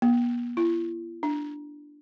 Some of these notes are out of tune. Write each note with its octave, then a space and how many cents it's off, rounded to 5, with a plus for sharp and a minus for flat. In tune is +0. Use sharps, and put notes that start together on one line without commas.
B3 -45
E4 +45
D4 +5